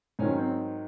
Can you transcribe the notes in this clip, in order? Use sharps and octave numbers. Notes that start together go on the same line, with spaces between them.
G#2 D#3 F#3 C#4
C4